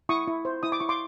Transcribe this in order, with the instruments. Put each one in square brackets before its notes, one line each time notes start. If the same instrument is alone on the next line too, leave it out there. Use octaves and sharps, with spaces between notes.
[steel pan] E4 C#6 D#6
E4
C5
E4 D#6
D6
E4 C#6
C6 D6